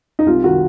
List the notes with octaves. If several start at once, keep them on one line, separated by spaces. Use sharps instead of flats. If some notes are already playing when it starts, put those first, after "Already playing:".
D#4
C2 F4
D#3 F#4